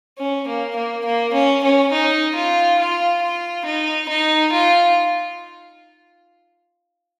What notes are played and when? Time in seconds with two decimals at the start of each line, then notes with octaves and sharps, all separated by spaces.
0.19 C#4
0.47 A#3
0.76 A#3
1.05 A#3
1.34 C#4
1.63 C#4
1.92 D#4
2.35 F4
2.79 F4
3.22 F4
3.66 D#4
4.09 D#4
4.52 F4